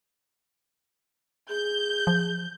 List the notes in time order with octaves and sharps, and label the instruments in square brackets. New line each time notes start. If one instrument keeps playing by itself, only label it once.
[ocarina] G#4 [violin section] G6
[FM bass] F3